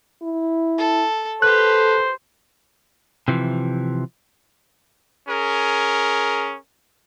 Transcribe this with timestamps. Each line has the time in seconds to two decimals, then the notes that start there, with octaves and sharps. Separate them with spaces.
0.22 E4
0.78 A4
1.42 G4 A4 B4 C5 F#6
3.28 C3 E3 F3
5.26 C#4 G#4 A#4